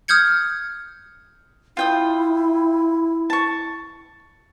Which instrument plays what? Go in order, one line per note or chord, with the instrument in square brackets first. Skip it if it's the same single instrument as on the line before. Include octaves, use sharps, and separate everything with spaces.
[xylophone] D#6 F6 G6 G#6 C#7
[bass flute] E4 [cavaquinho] F4 G5 D#6
[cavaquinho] A5 C#6